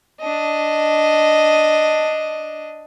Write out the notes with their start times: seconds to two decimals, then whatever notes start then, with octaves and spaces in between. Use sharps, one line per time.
0.21 D4 D#5